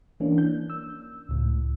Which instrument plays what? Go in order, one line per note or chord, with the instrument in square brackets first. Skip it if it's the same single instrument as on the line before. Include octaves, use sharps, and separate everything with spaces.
[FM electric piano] E3 A#3 C#4 D4
G6
E6
C#2 A2